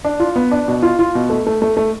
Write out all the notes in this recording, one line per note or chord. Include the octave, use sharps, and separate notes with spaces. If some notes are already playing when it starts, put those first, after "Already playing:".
D4
F4
B3
D4
B2
F4
F4
B2
A3
A3
A3
A3